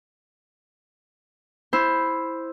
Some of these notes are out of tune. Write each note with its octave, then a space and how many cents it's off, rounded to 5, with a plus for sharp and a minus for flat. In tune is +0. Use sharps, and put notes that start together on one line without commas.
E4 +0 C5 +5